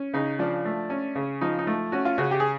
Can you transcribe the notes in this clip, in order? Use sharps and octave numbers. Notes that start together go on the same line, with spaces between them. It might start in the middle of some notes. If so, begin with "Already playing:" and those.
Already playing: C#4
C#3 D#4
F3 D4
A3
C#4
C#3
F3 D#4
D#4
A3
C#4 F#4
F4
C#3 F#4
G4
G#4